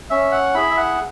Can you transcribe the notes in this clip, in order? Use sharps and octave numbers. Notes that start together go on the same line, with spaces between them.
C#4 E5
F#5
E4 G#4 B5
E5
F#5